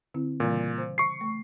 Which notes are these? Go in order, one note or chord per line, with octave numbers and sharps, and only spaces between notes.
D3 C4 E4
A#2 C#3 E3 G3
C5
C#6 C7
A3